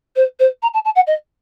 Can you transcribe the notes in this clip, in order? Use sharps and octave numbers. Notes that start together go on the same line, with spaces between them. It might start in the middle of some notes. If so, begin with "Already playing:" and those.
C5
C5
A#5
A5
A5
F#5
D#5